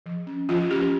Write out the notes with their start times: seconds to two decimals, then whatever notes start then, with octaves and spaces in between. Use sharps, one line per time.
0.06 F3
0.27 C#4
0.49 F3 F4
0.71 C#4 G4